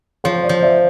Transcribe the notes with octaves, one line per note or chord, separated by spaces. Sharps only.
F3 C#5
D5
F3
D5 E5